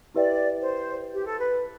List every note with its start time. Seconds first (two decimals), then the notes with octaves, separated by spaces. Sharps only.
0.14 E4 G4 B4 D5 E5 G5
0.61 C5
1.14 G4
1.25 A4
1.38 B4